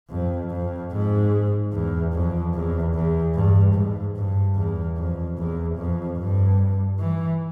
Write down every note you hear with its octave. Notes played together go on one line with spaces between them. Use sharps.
F2
F2
G#2
E2
F2
E2
E2
G2
G#2
G2
E2
F2
E2
F2
G2
E3